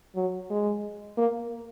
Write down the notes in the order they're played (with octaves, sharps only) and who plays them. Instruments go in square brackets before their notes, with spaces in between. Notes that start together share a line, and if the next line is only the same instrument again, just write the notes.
[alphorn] F#3
G#3
A#3